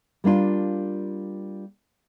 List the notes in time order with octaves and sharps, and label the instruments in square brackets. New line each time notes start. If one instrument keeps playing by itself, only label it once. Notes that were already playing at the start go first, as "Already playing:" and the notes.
[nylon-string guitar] G3 A#3 D4 F4